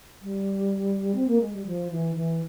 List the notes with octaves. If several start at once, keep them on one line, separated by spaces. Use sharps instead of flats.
G3
C4
A#3
G#3
G3
F3
E3
E3